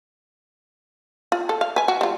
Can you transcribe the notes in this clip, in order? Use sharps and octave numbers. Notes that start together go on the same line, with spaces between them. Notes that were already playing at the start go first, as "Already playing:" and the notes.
F4
A4
F5
B4 G#5
F#4
G3 F4